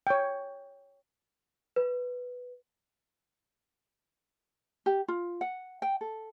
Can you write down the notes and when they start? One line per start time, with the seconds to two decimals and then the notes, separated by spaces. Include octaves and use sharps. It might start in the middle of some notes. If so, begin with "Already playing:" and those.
0.07 C#5 G5
1.76 B4
4.86 G4
5.08 F4
5.41 F#5
5.82 G5
6.01 A4